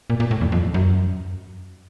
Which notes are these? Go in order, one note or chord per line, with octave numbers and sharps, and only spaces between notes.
A#2
A#2
A2
E2
F2
F#2